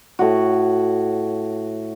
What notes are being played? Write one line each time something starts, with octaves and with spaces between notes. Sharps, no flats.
A2 F#4